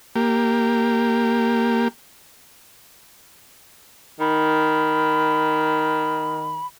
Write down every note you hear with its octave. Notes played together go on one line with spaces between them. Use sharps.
A#3 G4
D#3 B5